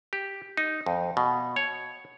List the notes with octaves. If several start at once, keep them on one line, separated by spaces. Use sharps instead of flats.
G4
D#4
F2
B2
C#5